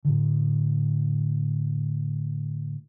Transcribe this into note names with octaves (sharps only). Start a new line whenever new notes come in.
A2 D3